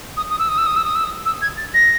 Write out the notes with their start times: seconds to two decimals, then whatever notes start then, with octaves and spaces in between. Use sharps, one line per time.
0.17 D#6
0.30 D#6
0.39 E6
0.48 D#6
0.58 E6
0.66 D#6
0.76 E6
0.85 D#6
0.95 E6
1.04 D#6
1.25 E6
1.42 G#6
1.57 A6
1.74 A#6